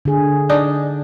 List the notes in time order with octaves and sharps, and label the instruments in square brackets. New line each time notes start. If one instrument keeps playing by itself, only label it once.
[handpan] D3 G#4
[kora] D4 D#4